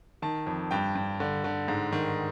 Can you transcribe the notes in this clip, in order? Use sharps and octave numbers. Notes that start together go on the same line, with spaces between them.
D#3 A5
F2
G2 G5
G2
D3
D3
G#2
D#3